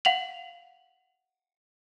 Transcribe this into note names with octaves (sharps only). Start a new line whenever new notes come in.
F5 F#5 F7 F#7